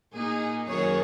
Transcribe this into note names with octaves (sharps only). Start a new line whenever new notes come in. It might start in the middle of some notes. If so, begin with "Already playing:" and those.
A#2 A#3 D#4 G#4
F#2 D#3 F#3 A#3 G#4 C#5